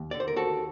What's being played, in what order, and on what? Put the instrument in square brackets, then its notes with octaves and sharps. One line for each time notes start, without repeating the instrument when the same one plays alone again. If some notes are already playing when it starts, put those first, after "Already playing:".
Already playing: [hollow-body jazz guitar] D#2
D3 D5
C5
A#4
D#2 F#4 A4